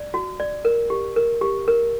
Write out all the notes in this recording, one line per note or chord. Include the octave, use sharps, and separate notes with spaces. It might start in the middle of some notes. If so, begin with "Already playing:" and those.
Already playing: D5
F#4
D5
A#4
G4
A#4
G4
A#4